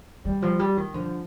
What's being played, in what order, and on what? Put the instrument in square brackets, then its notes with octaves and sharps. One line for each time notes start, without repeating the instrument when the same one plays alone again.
[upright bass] D#3 [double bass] G3
[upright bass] F3
G3
D#3
[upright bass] D3 [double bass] F3